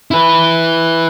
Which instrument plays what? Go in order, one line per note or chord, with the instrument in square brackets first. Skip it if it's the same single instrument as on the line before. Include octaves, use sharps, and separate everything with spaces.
[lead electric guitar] E4 B4